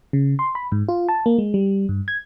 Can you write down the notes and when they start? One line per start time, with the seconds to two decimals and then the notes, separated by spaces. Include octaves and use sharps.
0.13 C#3
0.39 C6
0.55 B5
0.72 G#2
0.89 F4
1.09 A5
1.26 A#3
1.38 G#3
1.54 G3
1.89 G2
2.08 G#6